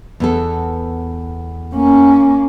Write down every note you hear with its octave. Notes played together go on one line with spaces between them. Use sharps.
E2 B3 A4
A#3 C#4